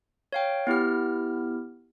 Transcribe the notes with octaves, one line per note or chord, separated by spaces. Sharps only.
C#5 F5 G5
B3 E4 G4 F6